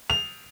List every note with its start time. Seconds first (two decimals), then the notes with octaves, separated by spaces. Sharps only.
0.10 F7